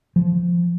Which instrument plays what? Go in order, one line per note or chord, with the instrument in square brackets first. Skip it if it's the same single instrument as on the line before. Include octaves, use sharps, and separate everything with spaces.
[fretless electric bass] F3